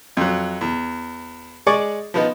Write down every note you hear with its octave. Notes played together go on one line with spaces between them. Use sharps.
F2 F#3
E2
G#3 G#4 D5 C#6 D6
F3 B3 D#4